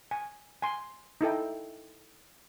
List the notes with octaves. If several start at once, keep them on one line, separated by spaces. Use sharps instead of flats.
G#5
G#5 C6
D#4 E4 A4 G5